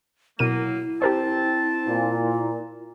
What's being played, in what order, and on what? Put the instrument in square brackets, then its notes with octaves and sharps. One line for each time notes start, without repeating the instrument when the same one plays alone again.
[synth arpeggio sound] B2 A#4 D#7 [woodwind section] F#3 A#3 [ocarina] E4
[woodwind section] C4 A5 [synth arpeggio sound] G4 A#4 C5
[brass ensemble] A#2